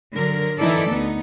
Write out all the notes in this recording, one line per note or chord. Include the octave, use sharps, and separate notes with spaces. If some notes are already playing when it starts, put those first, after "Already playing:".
D3 F#3 A#4
E3 D#4 E4 A4 D5
D2 B3 D#4